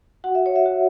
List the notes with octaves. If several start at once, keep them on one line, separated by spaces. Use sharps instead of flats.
F#4 F#5
E5
C#5
E5
F#4